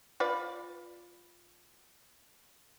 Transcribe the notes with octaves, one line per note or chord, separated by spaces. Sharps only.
F4 B4 D5